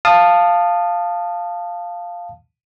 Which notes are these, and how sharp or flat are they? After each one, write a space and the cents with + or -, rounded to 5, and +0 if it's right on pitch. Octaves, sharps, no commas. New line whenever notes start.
F5 +0 A5 +0 D#6 -20